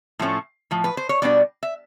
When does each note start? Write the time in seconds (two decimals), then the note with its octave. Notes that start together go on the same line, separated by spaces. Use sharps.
0.19 A2 F3 A3 C#4
0.71 A2 F3
0.84 B4
0.97 C5
1.09 C#5
1.22 B2 G3 B3 D4 D5
1.63 E5